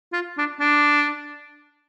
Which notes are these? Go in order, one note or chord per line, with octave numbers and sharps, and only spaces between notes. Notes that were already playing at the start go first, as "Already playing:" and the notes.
F4
D4
D4